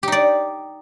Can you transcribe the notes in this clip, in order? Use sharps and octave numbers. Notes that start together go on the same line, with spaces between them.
D#4 G4 D5